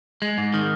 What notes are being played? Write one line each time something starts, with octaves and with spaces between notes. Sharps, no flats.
G#3
G#2
D#3